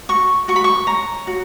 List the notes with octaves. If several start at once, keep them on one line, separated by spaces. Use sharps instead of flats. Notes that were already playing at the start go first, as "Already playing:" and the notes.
F#4 C#6
F#4 C#6
B5
C#6
C#5 A#5
F#4